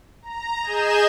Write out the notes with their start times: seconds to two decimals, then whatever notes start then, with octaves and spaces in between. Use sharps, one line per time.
0.22 A#5
0.63 G#4 D#5 G#5 G6 E7